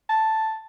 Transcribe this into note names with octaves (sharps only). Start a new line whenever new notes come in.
A5